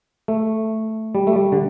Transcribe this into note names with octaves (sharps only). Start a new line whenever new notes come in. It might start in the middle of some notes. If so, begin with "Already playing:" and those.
A3
G3
A3
G3
D3